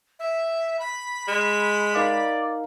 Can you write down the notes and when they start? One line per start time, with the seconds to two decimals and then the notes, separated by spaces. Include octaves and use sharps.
0.19 E5
0.79 B5
1.28 G#3
1.95 D#4 A#4 D5 F5